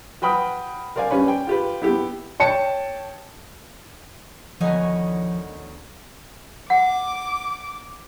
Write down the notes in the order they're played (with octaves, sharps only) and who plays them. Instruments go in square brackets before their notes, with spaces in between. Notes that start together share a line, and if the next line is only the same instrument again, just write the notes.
[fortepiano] F#4 B4 G5 B5 D#6 F6
A#4 C5 D5 F5 G#5
G3 C#4 B4
G5
F4 G4 B4
B3 E4 G4
[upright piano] C#5 G5 A5 C#7
[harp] D2 B3 A#5 [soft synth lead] D#3 [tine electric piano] F3 [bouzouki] D#4 C#5 G#5
[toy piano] F#5 [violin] D6